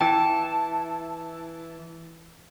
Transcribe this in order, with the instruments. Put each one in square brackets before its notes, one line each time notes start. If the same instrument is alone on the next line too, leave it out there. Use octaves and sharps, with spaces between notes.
[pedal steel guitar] E3 E4 [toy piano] G5 A#5 [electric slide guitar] A5